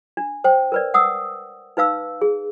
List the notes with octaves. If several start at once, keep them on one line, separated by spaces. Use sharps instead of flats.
D4
C5 G5
A#4 B4 D5
F#5 D#6 E6
D#4 B4 F5 E6
G#4